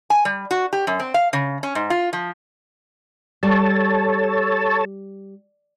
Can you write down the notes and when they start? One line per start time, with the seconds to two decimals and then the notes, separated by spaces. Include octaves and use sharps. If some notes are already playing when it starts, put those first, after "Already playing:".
0.10 G#5
0.25 G3
0.51 F#4
0.73 G4
0.87 F#2
1.00 C4
1.14 F5
1.33 C#3
1.63 C#4
1.75 G#2
1.90 F4
2.13 F3
3.43 G3 A4 C#5 A5